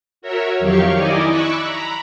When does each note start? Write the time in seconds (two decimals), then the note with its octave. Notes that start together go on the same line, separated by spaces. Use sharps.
0.22 F#4 A#4 C#5 E5
0.59 F2 D#3 F#3 G4 F5 C#6
0.97 D#4 E4 D5 D#5 G#5 D6
1.29 B5 C#6 D6 E6 F#6
1.64 A#5 B5